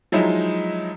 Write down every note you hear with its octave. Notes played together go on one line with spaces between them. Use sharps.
F3 F#3 G#3 D#4 E4